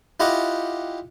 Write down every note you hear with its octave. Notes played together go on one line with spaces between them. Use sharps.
E4 F4 G4 D#5 F#5